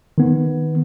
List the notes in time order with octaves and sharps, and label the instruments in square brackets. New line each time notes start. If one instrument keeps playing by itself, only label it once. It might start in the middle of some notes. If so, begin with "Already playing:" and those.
[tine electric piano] D#3 B3